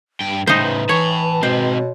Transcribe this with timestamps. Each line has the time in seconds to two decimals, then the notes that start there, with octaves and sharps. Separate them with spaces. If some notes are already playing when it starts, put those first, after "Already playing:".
0.21 G2 G5
0.47 A2 C#3 G3 D#4 C5
0.62 B4
0.89 E3 C#5 A5 B5
1.43 B2 G#3 C4 C5
1.78 C#5